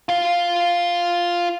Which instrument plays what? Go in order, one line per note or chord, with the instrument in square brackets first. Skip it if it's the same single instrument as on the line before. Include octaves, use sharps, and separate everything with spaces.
[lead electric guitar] F4 F5